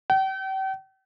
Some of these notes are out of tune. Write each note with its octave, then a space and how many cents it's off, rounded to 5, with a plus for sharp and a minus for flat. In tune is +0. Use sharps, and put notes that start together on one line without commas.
G5 -40